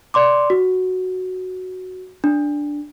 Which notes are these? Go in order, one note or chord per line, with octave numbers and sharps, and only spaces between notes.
D5 C6 D6
F#4
D4